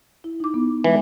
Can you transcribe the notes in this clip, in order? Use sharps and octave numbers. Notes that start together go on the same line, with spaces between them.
E4
D#4 D6
B3
E3 G#3